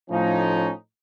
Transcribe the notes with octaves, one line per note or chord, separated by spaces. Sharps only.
A2 F3 C#4 D#4